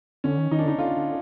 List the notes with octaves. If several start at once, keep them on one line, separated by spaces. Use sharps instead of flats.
D3 C#4
D#3
D#3 D#4
D4
D3 D#4
D3 F4
D3